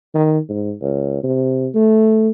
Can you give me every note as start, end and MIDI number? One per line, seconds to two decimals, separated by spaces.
0.14 0.39 51
0.49 0.73 44
0.81 1.19 37
1.23 1.68 48
1.75 2.31 57